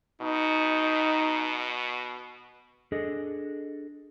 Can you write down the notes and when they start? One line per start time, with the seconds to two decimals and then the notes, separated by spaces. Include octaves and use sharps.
0.22 B2 D#4
2.92 D4 G#4 A4 D#5